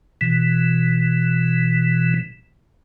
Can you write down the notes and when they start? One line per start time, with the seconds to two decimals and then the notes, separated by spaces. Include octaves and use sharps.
0.21 B2 E3